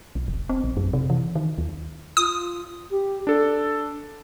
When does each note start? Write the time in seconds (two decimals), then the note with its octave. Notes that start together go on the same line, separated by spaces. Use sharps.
0.15 B1
0.28 E1
0.49 C4
0.64 A#1
0.77 F#2
0.93 C3
1.10 E3
1.35 D#3
1.58 D#2
2.17 F4 D#6
2.91 G4
3.27 D4 A4